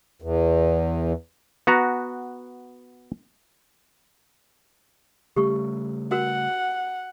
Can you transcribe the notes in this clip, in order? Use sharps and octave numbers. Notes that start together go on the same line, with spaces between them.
E2
B3 F#4 A#5
C#3 G3 A3 G4 C#6
F#4 A#4 F#5